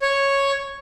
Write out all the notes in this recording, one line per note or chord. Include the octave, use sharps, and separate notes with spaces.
C#5